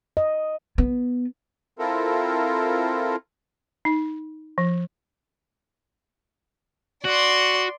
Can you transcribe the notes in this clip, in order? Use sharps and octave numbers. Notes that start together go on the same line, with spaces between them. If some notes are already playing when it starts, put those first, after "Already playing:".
D#5
B3
C4 E4 F4 A4 A#4
D#4
F3
F#4 D5 C6